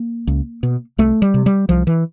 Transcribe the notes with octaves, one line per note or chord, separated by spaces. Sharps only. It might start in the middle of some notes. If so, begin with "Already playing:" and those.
Already playing: A#3
C#2
B2
C2 A3
G3
C3
G3
C2 F3
E3